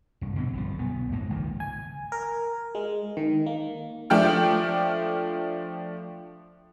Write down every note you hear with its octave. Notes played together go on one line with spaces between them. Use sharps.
C2 G2
B2 D3 A3 C4
G1 C2 F3
B1 B3
G#2 G#3 A#3
G#1 C#2 D#3 F3
G#5
A#4
G#3
D#3
A#3
F3 A3 D4 G5 F6